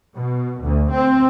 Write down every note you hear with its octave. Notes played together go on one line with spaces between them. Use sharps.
B2
D2
C4